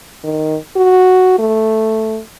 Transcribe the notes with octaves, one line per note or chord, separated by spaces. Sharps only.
D#3
F#4
A3